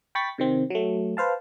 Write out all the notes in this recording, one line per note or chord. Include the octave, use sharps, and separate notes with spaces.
G5 B5 C#6 A6 B6
C3 D#3 C4
F#3 A3
B4 C5 F5 A5